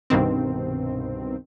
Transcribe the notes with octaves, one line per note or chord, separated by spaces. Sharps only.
C2 G2 B2 D#3 C4